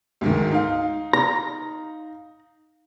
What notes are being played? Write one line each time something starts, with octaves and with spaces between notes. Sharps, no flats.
D2 G#2 D#3
D#4 F5
A#5